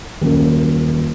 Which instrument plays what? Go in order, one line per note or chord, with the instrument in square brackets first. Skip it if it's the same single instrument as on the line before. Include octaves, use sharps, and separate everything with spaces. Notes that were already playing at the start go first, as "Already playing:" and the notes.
[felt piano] D#1 F#2